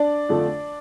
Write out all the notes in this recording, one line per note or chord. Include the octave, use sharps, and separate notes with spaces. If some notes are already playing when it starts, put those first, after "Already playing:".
Already playing: D4 D5
F2 D3 F3 A3